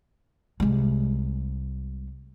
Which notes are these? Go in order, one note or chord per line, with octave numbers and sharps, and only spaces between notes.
C2 G#3